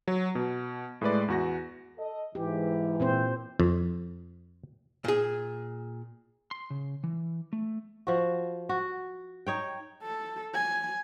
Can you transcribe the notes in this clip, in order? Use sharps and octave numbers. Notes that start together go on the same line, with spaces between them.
F#3 F#4
B2
A2 G#3 B4 D5
E2 F#4 A#6
A4 D#5
G#2 E3 G4
A#2 C4 C5
F2
A#2 G#4
C6
C#3
E3
A3
F3 F#4
F#4
D#4 C#5 G5
A4
G#5